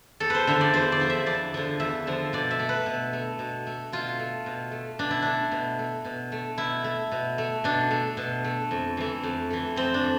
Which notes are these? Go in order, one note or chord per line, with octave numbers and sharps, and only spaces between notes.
E2 A4
B4 C5
D3 F3 E5
D5
E2 C5
D5
D3 F3
E5
E2 D5
D3 F3
E2 E5
D3 F3
B2 D5
E5
A3
B4
B2
A3
B2
A3
B2 F4
A3
B2
A3
B2 D4
E4
A3 D4
B2
A3
B2
A3
B2 E4
A3
B2
A3
B2 D4
A3
B2
A3
F2
E3 A3
F2
E3 A3
F2 C4
D4
E3